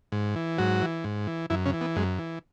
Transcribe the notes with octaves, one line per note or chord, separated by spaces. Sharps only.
G#2
E3
G#2 F#3 F#4
E3
G#2
E3
F#2 E3 E4
C#3 C#4
E3
B3
F#2 G#3
E3